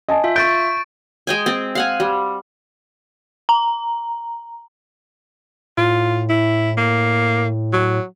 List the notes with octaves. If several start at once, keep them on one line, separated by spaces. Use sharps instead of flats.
D#5 G#5 A5
F4 E5
C#6 G6 A6 D7
G#3 G5 G#5
C4
F5 F#5 G#5
G3
A#5
A2 F4
E4
A#3
F#3